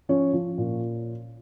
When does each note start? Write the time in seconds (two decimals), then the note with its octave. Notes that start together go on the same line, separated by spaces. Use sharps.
0.09 F3 C#4
0.33 F3
0.58 A#2